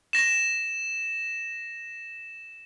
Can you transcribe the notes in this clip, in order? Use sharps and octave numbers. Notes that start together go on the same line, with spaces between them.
A#6 E7